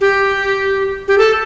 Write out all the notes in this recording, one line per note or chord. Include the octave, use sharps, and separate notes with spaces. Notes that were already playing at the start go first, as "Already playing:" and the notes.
G4
G4
A4